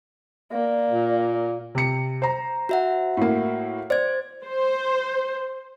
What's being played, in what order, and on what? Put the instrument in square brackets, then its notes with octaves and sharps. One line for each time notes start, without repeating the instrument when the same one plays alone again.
[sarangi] A#3 [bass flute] D5
[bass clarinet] A#2
[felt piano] C3 C#7
C5 A#5
[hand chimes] F#4 E5 F#5
[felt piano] A2 A#3
[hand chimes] C5 G#6 [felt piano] D5
[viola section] C5